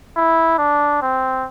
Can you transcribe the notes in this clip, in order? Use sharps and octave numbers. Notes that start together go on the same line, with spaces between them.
E4
D4
C4